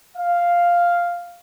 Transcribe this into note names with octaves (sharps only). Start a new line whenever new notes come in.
F5